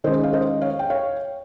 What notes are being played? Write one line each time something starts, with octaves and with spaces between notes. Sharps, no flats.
D#3 G#3 C#4 C5 D#5
F5
C5 D#5
C#5 F5
G5
C#5 F5